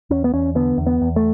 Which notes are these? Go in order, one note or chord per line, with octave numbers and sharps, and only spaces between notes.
E2 C#4
B3
E2 C#4
D3 B3
E2
B3
E2
A3